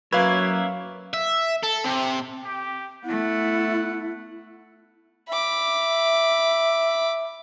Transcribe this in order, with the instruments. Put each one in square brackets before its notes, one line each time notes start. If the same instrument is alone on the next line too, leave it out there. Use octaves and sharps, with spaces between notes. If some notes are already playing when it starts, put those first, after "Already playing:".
[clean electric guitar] F#2 A#3 E4 [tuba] F#3 [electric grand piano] B4 F5 [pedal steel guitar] C#5
[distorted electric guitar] E5
A4
C3
[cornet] G4
[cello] A3 B3 [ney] E4 [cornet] F#5
[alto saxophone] E5 [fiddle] B5 D6